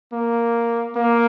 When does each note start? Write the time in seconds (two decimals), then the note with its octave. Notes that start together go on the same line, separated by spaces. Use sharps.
0.13 A#3
0.96 A#3